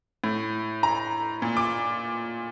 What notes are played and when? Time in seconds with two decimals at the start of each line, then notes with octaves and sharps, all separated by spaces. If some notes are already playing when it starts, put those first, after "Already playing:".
0.24 A2
0.83 A#5
1.42 A#2
1.57 D6